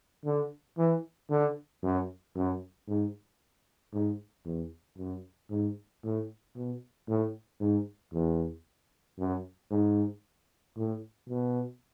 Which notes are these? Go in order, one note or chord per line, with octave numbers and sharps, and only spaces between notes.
D3
E3
D3
F#2
F#2
G#2
G#2
E2
F#2
G#2
A2
B2
A2
G#2
E2
F#2
G#2
A2
B2